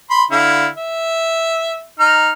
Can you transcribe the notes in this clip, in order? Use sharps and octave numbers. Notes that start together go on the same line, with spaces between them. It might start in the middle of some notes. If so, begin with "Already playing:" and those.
B5 C6
D3 E4 F5
E5
D#4 F6